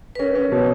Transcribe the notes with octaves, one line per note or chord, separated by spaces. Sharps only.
B4
C#4 A#4
C#4
B2